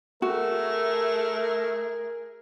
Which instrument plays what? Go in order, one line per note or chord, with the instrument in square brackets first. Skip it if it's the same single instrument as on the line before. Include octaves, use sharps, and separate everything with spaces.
[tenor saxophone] A3 [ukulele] F#4 [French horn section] G#4 A#4